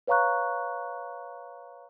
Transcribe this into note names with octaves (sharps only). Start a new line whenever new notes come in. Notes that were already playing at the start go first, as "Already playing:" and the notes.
B4 C#5 F5 A#5 C#6 F#6